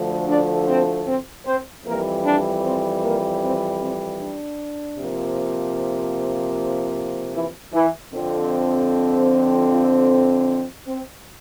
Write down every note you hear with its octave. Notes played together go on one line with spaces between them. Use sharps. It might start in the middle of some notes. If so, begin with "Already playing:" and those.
Already playing: D2 D3 F3 A3
D4 D5
C4 C5
C4 C5
C4 C5
F2 E3 G3 A#3 A#4
D4 D5
C4 C5
A#3 A#4
C4
C4
D4
C3 F3 A#3
E3 E4
E3 E4
F2 D3 F3 C4
F3 F4
C4